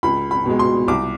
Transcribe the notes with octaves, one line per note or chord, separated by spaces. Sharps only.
C#2 B5
B5
B2 G#3
C6
C2 D6